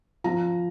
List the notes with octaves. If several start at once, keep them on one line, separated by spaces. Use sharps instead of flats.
F3 A#5